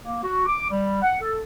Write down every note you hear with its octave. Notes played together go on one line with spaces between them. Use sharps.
A#3
F#4
D6
G3
F#5
A4